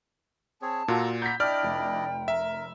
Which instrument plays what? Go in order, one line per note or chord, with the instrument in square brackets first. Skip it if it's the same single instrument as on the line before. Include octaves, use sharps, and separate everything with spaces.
[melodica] C4 G#4 C#5 [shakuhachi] A5
[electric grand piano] A#2 [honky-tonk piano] F4 F#4 [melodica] A4 A#5
[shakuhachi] F#5 [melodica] A#5 B5 [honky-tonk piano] G6 B6
[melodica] D4 E4 D#5 [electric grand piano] D5 [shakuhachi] G5 [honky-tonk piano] F6
[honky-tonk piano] F1
[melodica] A#4 [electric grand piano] E5